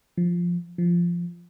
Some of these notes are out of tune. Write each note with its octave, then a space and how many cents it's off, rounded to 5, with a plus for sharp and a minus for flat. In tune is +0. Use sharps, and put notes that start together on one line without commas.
F3 +0
F3 -10